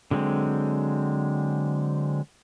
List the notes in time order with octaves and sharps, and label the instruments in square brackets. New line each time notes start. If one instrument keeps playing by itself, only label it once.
[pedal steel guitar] D3 F#3 G#3 C4